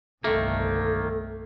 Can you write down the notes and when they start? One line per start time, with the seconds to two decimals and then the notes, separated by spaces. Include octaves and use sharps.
0.24 G1 C2 D#3 A3 A#3 A4